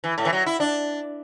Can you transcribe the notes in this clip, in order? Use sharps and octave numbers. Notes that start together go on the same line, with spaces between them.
E3
A2
E3
F#3
E4
D4